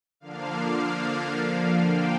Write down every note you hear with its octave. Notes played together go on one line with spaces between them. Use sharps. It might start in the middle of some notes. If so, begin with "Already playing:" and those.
D3 F3 A#3 D4 F5
G5